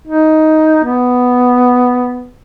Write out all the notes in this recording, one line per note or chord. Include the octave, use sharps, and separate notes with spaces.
D#4
B3